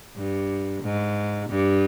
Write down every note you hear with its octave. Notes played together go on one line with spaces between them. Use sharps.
G2
G#2
G2